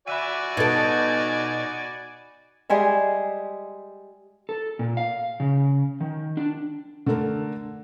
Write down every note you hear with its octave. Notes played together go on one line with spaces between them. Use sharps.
F#4 D5 E5 G#5 B5 F#6 D#7
B2 D#4 A4 G#6 A6 D7
G3 G#3 G#4 E5
A4
A#2
F5
C#3
D#3
D4
D3 A3 A4 A#4